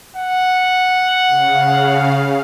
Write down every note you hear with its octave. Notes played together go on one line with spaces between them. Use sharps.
F#5
C#3 F5